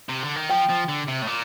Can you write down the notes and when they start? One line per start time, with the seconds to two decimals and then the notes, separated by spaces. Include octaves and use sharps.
0.09 C3
0.23 D3
0.36 D#3
0.49 F3 G5
0.69 F3
0.89 D3
1.08 C3
1.22 A2
1.27 A#2